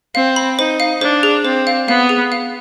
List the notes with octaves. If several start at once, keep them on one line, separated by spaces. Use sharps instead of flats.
C4 F5
B5
D#4 C5
F5
D4 C5
G#4
C4 C5
F5
B3 F5
G#4
F5